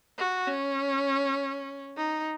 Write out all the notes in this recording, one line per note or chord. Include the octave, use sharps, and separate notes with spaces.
F#4
C#4
D#4